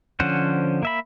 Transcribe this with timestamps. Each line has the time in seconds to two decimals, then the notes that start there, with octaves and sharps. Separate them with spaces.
0.20 D3 F3 C#4 C5 F#5
0.83 A#3 E5 B5